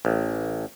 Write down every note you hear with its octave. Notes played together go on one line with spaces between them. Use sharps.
A1